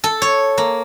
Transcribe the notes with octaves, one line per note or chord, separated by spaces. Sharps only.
A4
C#5
A#3